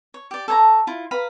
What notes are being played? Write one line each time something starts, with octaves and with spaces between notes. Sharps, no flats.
C#5
G4 D5
A4 C#5 G#5 A#5
E4 F4
B4 F5 A#5 B5